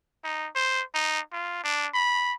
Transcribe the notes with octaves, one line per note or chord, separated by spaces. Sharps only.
D#4
C5
D#4
F4
D4
B5